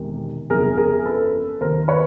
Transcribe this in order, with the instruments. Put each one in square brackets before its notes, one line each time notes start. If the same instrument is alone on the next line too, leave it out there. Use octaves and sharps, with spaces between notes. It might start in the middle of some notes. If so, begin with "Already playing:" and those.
Already playing: [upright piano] E1 C3 D#3
G1 F2 C#3 G#4 A#4
G#4 A#4
A4 B4
D#2 D#3 A#4 C5
B4 C#5